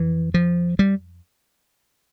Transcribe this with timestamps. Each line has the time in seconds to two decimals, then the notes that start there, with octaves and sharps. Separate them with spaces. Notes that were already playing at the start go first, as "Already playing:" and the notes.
Already playing: F2 E3
0.34 F3
0.79 G3